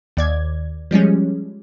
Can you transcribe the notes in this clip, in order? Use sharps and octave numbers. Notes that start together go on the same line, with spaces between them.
D#2 D5 G#6
F3 G3 G#3 C#4